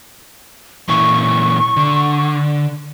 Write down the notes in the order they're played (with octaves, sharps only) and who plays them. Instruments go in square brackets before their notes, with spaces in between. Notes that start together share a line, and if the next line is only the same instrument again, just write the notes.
[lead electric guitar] A#2 E3 [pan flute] C#6
[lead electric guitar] D3